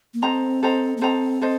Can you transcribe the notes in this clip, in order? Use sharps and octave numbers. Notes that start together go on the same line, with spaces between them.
A#3
C4 A4 C5 D#5 A#5
A4 C5 D#5 A#5
A#3
C4 A4 C5 D#5 A#5
A4 C5 D#5